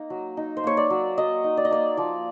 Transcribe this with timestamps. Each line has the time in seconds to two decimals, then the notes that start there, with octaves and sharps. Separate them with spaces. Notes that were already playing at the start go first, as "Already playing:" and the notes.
Already playing: A#3 D#4
0.10 F#3
0.37 D#4
0.57 C5
0.64 A#3 C#5
0.77 D5
0.90 F#3
1.18 F#3 D#5
1.44 D#4
1.57 D5
1.65 D#5
1.71 A#3 D5
1.97 F3 D5